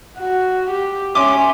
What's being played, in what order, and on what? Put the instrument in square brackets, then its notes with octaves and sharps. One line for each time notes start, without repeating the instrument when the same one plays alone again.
[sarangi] F#4
G4
[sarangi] C#4 [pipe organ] E5 G#5 C6 [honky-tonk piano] D6